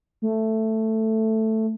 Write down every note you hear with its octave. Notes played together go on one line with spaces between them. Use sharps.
A3